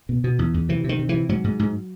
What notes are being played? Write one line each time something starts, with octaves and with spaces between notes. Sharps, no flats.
B2
B2
E2
E2
C3 E3
C3 D#3
C3
E3
C3
G#2 F#3
G#2
G#2